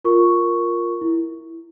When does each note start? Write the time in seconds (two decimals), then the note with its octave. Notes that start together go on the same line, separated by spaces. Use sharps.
0.04 F4 A#4 C#6
1.01 E4